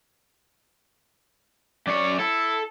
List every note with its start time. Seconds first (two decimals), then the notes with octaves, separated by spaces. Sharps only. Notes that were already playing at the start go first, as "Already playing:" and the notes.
1.87 F#2 C#5 D5
2.19 E4 A4